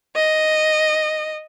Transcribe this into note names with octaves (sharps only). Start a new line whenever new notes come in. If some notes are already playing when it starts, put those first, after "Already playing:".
D#5